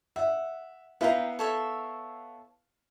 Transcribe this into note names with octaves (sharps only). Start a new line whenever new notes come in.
E5 F#5
B3 E4 B4 F5 G5 A#5
A4 C#5 E5